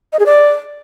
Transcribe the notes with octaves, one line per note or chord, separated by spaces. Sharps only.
D#5
G#4
D5